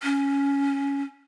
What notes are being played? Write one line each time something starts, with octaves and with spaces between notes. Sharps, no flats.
C#4